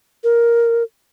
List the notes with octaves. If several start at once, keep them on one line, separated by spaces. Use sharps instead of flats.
A#4